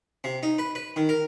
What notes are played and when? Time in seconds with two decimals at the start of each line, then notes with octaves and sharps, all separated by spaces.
0.24 C3
0.43 D#4
0.58 B4
0.75 B4
0.96 D#3
1.09 A#4